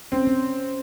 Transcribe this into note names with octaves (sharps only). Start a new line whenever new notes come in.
C4 C#4
C#4